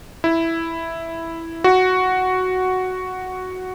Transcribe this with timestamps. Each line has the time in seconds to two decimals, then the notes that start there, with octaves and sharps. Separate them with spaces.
0.24 E4
1.64 F#4